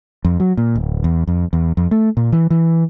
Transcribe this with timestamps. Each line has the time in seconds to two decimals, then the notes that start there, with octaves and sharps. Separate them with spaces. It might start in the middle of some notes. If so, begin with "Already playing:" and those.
0.25 F2
0.40 F#3
0.57 A#2
0.76 D1
1.04 E2
1.28 F2
1.53 E2
1.77 F2
1.91 A3
2.17 A#2
2.32 E3
2.50 E3